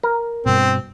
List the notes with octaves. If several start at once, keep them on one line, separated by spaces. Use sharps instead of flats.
A#4
G2 B2 C4